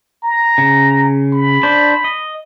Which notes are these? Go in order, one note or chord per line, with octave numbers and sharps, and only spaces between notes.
A#5
C#3
B5
D4 C5 D5
D#5